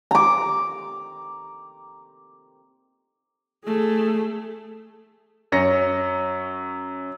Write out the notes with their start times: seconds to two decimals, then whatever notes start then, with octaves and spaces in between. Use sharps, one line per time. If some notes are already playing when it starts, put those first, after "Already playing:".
0.11 A#5 D6
3.65 A3 G#4
5.52 F#2 C#4 A#6 C#7